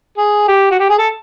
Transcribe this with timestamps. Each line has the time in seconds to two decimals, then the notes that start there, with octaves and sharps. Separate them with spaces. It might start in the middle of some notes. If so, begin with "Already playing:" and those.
0.17 G#4
0.48 G4
0.71 F#4
0.79 G4
0.89 G#4
0.98 A4